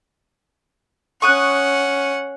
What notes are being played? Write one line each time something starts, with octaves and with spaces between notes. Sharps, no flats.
C#4 F#5 C#6 D#6 F#6